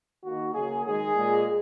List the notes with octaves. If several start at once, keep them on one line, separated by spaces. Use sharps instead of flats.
D#3 A#3 F#4
C#3 F#3 A#3 G#4
D#3 G#3 G#4
A#2 G#3